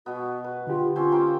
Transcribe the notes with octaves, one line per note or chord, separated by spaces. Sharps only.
B2 B3 F#4
B4
D3 F4 G4
C4 C#4 F4 C5
A#3 C5 G5